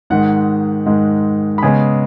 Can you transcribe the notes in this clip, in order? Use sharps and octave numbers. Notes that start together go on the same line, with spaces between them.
G#2 D#3 G#3 F#5
G#2 D#3 G#3
B5
C#3 G#3 B3 G#5